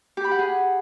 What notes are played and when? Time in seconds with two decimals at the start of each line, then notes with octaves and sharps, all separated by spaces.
0.17 G4
0.24 B5
0.31 F#5
0.39 G#4